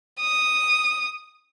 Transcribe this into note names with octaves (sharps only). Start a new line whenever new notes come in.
D#6